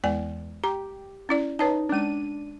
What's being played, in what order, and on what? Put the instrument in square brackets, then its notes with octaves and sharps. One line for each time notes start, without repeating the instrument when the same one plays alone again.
[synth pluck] E2 [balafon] G#3 D5 G#5
[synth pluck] G4 [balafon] A#5
[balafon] C#4 E4 D5
[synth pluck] D#4 [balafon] B4 C#5 A5
[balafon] G#3 C#4 [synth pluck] D4 D#7